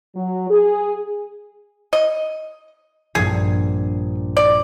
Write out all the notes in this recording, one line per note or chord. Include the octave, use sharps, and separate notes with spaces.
F#3
G#4
D#5
A#1 G2 G#4
D5